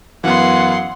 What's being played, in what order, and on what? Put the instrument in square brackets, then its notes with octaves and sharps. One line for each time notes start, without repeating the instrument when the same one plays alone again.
[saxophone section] F#2 F#3 F5 [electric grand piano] E3 B3 [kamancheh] F#5 C6